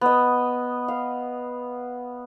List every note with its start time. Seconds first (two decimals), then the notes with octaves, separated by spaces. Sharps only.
0.01 B3 D#5
0.88 F5